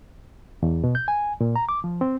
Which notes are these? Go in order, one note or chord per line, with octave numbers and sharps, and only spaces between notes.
E2
B2
G6
G#5
A#2
A#5
D6
F3
C4